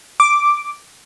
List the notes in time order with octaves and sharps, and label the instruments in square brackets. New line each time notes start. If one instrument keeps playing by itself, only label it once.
[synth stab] D6